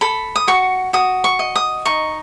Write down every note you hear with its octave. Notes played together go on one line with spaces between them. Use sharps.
A4 B5
D#6
F#4 C#6
F#4 D#6
C#6
D#5
D#6
D#4 C#6